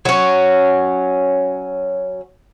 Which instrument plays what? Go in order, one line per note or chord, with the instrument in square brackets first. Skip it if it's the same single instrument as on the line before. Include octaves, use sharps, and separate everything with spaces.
[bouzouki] F#3 C#4